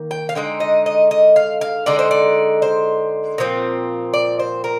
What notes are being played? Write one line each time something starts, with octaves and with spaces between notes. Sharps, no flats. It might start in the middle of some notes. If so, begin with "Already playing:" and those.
Already playing: D#3 A#3
G5
F5
D3 G#3 D#4 G5
D#5
D#5
D#5
F5
F5
D3 G#3 D#4 D5
C5
D5
C5
A#2 F3 C4
D5
C5
A#4